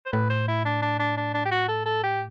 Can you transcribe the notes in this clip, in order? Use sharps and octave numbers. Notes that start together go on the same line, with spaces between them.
C5
A2 B4
C5
E4
D4
D4
D4
D4
D4
G4
F#4
A4
A4
G4